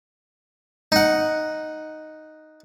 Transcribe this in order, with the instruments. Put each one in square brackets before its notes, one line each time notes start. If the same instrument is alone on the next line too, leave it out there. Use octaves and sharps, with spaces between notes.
[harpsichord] D#4 F#5